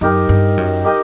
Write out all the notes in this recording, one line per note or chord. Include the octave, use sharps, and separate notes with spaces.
F#2 D#4 G4 A#4 D#5
G2
F#2
D#4 G4 A#4 D#5